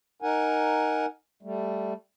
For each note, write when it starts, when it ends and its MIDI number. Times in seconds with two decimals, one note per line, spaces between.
0.22 1.06 63
0.22 1.06 70
0.22 1.06 78
0.22 1.06 80
1.43 1.93 55
1.43 1.93 57